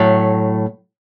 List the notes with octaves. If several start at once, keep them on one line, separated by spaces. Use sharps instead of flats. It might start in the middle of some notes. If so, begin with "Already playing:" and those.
Already playing: A2 F#3 A3